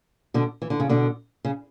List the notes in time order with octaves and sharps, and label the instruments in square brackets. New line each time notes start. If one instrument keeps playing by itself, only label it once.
[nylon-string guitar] B2 D3
E3
D3
C#3
B2 D3
C#3